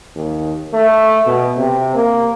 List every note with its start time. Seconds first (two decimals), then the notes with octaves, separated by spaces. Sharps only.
0.15 D#2
0.74 A3
1.27 B2
1.58 C3
1.95 A#3